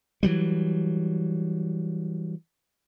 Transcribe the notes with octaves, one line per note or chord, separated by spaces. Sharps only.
E3 F#3 G3